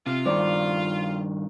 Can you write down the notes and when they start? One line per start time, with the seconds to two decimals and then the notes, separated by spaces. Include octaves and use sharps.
0.07 C3 F4
0.26 G2 D#3 C5 D5